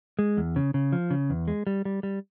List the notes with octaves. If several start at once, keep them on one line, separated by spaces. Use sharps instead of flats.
G#3
E2
C#3
C#3
F3
C#3
E2
G#3
G3
G3
G3